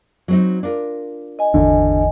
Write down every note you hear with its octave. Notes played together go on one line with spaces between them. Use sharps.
F#3 C4 D#4
D4 F4 A#4
D#5 G#5
G#1 E2 D3